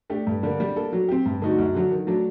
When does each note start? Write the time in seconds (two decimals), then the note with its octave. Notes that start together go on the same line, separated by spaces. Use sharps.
0.10 A3 D4 G4
0.27 G2
0.43 D3 G3 A#3
0.60 G3
0.76 A#3 D4 A4
0.93 F#3
1.08 C4 G4
1.26 G2
1.42 D3 A3 D#4 F#4
1.59 F#2
1.75 D3 F#3
1.91 D#3
2.07 F#3 A3 D4